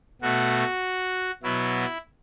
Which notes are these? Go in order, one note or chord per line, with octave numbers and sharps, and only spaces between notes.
B2 A3 F#4
B2 F#3 B3 E4